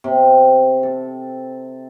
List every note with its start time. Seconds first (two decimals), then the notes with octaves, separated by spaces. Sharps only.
0.04 C3
0.83 A4